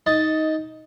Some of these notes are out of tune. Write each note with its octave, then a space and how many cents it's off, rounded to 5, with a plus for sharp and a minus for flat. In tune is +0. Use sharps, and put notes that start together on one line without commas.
D#4 +15 D#5 +5 A5 +0